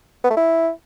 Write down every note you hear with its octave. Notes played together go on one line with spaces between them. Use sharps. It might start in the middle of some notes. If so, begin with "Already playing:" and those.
B3
A3
E4